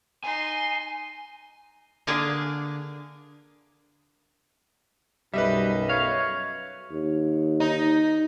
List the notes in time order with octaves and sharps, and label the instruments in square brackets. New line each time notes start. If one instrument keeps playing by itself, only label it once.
[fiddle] D#4 C6 [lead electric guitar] G#5
[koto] D3 A#3 D4 G#4
[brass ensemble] B1 F#2 [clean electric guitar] G3 [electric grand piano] B4 D#5 E5
[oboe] C#5 [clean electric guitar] F5
[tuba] D#2
[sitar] D#4